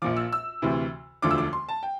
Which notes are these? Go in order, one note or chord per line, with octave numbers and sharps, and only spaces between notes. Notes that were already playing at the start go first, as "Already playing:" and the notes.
A#1 A#2 F3 D6
E6
E6
D2 C3 E3
E1 D2 D3 F3 D6
E6
D6
C6
A5
G5